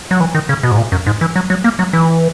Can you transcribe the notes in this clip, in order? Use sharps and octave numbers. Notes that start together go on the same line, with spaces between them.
F#3
E3
D#3
C#3
B2
G#2
A#2
F#2
G#2
E3
F#3
F#3
A#3
F#3
E3